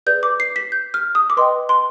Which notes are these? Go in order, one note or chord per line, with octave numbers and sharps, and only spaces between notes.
G#4 B4 D5 G6
D6
C7
B6
G6
F6
D#6
D6
B4 D#5 G5 C6
C6